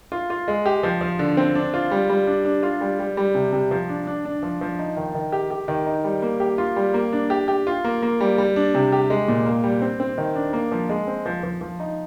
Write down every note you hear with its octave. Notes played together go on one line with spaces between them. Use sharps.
F4
F4
G#3
G4
F3
F3
D3
C4
D4
F4
G3
G3
D4
D4
F4
G3
G3
G3
C3
C3
F3
D4
D4
D4
F3
F3
D#4
D#3
D#3
G4
G4
D#3
D#4
G3
A#3
G4
F4
G3
A#3
D4
G4
G4
F4
A#3
A#3
G3
G3
D4
C3
G4
G#3
A#2
A#3
G3
C4
C4
D#3
D4
A#3
F3
G#3
C4
F3
F3
F3
D#4